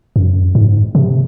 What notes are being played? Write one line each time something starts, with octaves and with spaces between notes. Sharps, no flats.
F#2
G#2
C3